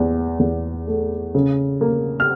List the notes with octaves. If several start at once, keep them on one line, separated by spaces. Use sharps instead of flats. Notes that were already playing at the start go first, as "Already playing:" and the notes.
Already playing: E2
E2
A3
C#3
A#3
F6